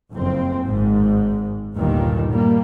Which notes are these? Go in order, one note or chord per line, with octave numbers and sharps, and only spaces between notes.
F#1 F2 C4
G#1 G#2
G1 D#2 A#2 D#3 G3
G3 A#3